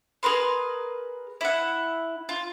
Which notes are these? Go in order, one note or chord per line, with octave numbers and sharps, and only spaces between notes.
G#4 A#4 B4 C6
E4 F#5
F4